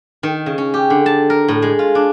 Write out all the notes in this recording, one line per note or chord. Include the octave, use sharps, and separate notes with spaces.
D#3
C#3
C#4
G4
D3
A5
A#4
A2
G#3
F4
D4